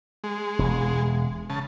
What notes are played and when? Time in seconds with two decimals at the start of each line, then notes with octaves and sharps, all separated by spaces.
0.24 G#3
0.59 E1
1.50 C#3 A5